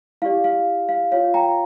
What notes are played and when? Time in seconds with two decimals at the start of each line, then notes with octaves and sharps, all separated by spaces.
0.22 E4 G4 D5 F5
0.44 F5
0.89 F5
1.12 F4 C#5 F5
1.34 G5 A#5